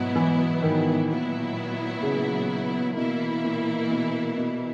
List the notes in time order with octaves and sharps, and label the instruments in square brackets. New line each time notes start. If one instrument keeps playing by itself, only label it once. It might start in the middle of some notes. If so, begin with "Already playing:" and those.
Already playing: [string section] G#2 F#3 B3 E4 [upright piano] B2
[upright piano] E3
D#3
[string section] A#2 F#3 B3 E4
[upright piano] C#3
[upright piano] B2 [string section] E3 A#3 E4
[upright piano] A#2
B2
B2